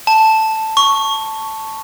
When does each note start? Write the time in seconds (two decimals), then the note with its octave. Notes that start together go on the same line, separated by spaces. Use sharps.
0.07 A5
0.77 C#6